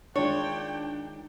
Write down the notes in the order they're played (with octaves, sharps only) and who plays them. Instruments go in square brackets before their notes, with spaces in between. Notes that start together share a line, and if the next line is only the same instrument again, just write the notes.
[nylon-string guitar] D#3 G#3 F4 [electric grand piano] D4 [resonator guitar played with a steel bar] C#5 [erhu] G5